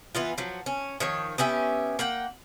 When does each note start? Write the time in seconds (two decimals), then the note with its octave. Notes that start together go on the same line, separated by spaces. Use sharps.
0.15 E3 B3 F4
0.38 F3 F#3
0.66 C#4
1.00 D#3 F3 C#5
1.38 B3 C#4 G4 E5
1.99 A#3 F#5 G5